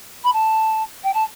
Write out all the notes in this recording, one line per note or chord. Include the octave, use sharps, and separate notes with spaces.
B5
A5
G5
A5